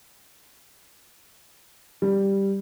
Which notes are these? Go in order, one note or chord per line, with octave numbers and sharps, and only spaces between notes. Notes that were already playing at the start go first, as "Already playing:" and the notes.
G3